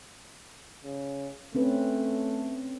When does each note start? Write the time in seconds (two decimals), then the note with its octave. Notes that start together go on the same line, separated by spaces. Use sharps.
0.84 C#3
1.55 A3 C4 C#4 B4